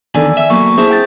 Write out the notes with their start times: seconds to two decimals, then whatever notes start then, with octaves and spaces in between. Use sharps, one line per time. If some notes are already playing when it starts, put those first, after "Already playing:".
0.15 E2 D3 D#3 A4 D5 G#5
0.37 E5
0.50 F#3 A#3 B3 C#6
0.78 C4 E4 G#4 C5 E5 A5
0.91 G5 G6 A6